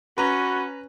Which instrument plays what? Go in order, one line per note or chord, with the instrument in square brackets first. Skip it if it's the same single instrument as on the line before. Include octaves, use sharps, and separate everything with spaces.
[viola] C#4 [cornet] F#4 [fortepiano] B4 A#5 [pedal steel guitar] B5 C#6 D6